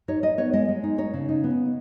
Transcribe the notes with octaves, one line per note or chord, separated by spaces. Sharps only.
D#4 C#5
D#4 D#5
B3 C#5
G#3 D#5
G#3
D#4
D#4 C#5
C#3
D#4
B3